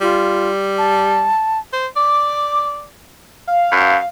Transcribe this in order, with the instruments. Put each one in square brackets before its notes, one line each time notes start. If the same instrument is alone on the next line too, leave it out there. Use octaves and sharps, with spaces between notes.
[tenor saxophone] G3 [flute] F4
[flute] A5
[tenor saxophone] C5
[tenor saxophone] D5 [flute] D6
[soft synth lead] F5
[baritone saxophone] F#2